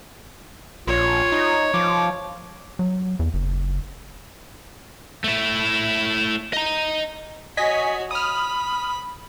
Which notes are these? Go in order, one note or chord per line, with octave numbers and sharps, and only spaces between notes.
A#1 F4 C#5
D#4
F3 D6
F#3
E2
F#1
A3 E4
D#5 A#5
F#4 C#5 D#5 G#5 B6
B5 D#6 F6